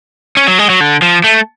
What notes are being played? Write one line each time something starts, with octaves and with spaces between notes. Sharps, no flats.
C#4
F#3
G#3
F#3
D3
F3
A3